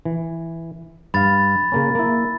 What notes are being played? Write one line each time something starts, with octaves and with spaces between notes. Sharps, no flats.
E3
G2 F5 B5 A6
C#3 A#3 C#4
A#3 E4